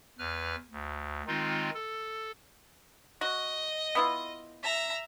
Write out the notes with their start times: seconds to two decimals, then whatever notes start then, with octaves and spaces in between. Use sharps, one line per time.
0.19 E2 B4 F6
0.72 D2
1.27 D#3 G#3 C4 D#4 F4
1.75 A4
3.21 F#4 D#5
3.95 B3 E4 F4
4.63 E5 A#5